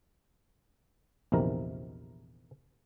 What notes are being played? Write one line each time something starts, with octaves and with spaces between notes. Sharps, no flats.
A#1 E2 C3 D#3 A#4 A#5